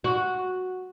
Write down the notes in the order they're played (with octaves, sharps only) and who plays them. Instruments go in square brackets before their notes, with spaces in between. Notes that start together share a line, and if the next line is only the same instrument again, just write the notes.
[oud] F#4